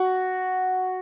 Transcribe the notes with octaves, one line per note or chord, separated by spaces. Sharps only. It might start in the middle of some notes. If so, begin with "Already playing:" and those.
Already playing: F#4